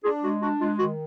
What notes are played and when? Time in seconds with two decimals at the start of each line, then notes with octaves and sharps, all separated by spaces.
0.04 D4 F4 G#4
0.22 G#3 F#4
0.41 D4 F#4
0.60 G#3 F4
0.79 D#3 F#4